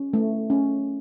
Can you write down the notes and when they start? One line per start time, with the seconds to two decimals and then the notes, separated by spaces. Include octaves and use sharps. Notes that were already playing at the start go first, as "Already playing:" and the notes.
Already playing: C#4
0.13 A3
0.50 C#4